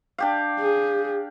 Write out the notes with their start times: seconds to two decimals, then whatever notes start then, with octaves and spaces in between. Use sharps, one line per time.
0.18 D4 G4 F5
0.60 G#4